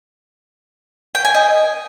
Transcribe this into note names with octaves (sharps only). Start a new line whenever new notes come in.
G5
G#5
D#5